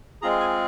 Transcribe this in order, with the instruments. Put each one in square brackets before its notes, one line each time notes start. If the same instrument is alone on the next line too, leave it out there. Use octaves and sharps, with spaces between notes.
[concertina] G#3 C4 F4 G#4 A#5
G#5